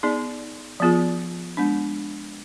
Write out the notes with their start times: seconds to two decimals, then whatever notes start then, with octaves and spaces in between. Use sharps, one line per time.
0.03 B3 D#4 G#4 D5
0.80 F3 B3 F4 G#4
1.57 G#3 B3 D4